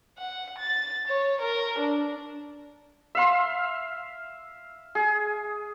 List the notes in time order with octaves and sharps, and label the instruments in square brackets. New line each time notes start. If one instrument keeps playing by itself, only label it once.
[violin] F#5
A6
C#5
A#4
D4
[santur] E5 F5 C6
G#4